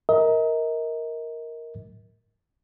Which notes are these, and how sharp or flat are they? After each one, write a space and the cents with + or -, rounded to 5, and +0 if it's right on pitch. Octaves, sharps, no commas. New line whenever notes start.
A#4 +0 D#5 +35